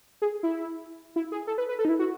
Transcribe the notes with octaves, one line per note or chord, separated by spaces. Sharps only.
G#4
E4
E4
G#4
A4
B4
B4
A4
D#4
E4
F#4